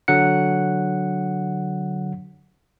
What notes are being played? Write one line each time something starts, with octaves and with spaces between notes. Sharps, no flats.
D3 F#3 F#5 C#7